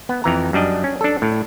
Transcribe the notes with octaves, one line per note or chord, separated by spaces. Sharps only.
B3
F2 E3 A#5
F#2 G3 D4 D#5
C#4
D4 A4
A2